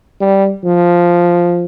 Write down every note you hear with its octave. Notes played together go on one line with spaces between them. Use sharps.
G3
F3